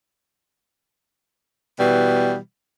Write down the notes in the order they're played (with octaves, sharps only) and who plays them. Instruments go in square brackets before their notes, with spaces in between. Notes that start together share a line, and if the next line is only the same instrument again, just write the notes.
[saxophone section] B2 E3 G3